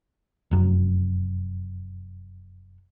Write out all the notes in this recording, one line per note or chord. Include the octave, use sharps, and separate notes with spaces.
F1 F#2